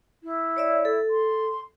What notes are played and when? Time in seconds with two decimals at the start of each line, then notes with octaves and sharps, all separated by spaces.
0.23 E4
0.57 C#5 D5 E5
0.85 A4
1.10 C6